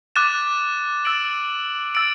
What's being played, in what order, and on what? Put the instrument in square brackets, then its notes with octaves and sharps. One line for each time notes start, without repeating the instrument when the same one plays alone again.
[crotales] D6 F#6 A6 E7
E6 A6 D7 F#7
E6 A6 D7 F#7